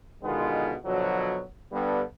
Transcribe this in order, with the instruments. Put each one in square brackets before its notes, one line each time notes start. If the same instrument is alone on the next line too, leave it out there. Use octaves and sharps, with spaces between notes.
[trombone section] B2 D3 D#3 G#3 B3 F4
B2 D3 F3 F#3
G2 D3 G3 B3